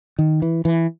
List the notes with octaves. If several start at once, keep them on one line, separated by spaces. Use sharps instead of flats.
D#3
E3
E3